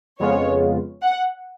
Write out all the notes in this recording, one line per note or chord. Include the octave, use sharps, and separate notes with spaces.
F2 C#3 G#3 B3 F4 C#5
F#5